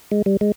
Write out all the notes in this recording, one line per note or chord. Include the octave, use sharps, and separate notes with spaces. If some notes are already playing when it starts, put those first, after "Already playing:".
G#3
G3
G#3